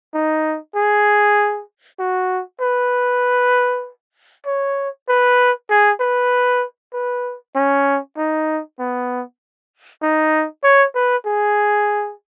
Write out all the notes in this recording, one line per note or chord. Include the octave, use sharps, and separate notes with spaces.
D#4
G#4
F#4
B4
C#5
B4
G#4
B4
B4
C#4
D#4
B3
D#4
C#5
B4
G#4